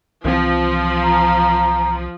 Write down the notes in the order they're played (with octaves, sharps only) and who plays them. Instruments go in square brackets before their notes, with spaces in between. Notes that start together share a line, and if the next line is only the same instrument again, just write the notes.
[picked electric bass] C2 E3 C4 [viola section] F3
[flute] A#5